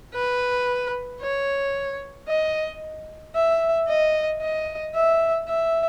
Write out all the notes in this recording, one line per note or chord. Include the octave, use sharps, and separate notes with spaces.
B4
C#5
D#5
E5
D#5
D#5
E5
E5